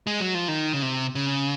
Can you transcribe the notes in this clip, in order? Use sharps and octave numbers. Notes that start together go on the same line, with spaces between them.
G#3
F#3
F3
D#3
C#3
C3
C#3